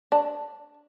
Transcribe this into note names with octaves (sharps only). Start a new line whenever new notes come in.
D4